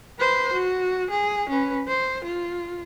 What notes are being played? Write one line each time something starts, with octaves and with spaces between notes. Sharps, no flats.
B4 C5
F#4
G#4
C#4 B4
C5
F4